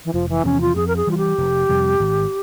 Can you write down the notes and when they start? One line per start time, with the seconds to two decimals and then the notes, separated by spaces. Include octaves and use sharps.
0.05 E3
0.14 F1 F3
0.29 E3
0.45 E2 C3 F3 C#4
0.61 F4
0.76 F2 G#4
0.87 A#4
0.96 G#4
1.07 E3 G3 F4
1.17 G4
1.38 F1
1.69 F2 C3 G3
2.00 G#1